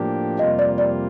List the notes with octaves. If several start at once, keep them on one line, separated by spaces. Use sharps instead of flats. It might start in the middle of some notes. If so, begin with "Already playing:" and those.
Already playing: A2 F3 A#3 D4 G4
F2 C3 G3 A#3 F4 D#5
D5
D5